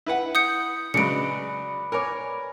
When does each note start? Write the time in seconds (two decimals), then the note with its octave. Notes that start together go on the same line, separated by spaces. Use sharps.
0.06 E4 B4 F#5
0.35 D#6 G6 C#7
0.94 C#3 F#3 G#3 B4 D5 C#7 D7
1.92 A#4 C#5 G#5 D6